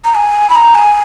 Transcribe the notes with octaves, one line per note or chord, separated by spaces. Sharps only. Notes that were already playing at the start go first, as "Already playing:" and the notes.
A#5
G#5
B5
A#5
G#5